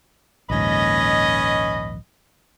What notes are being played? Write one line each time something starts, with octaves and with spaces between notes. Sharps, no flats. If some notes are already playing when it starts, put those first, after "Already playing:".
A#1 D#2 G#2 C#4 B4 D#5